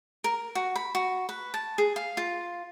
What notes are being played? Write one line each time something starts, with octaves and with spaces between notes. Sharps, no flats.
A#4
F#4
B5
F#4
B4
A5
G#4
F5
F4